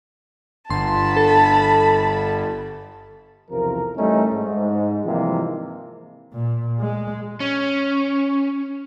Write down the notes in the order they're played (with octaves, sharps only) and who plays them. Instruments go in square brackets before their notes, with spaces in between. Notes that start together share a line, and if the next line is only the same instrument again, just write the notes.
[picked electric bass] G1 [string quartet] A5 B5 [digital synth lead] C6
[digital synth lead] A4
[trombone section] B1 E2 C3 F3 A#4
A1 G3 A3 C#4 D#4
G#2
C3 E3 F3 G3 G#3 A#3
[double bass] A#2
G#3
[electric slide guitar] C#4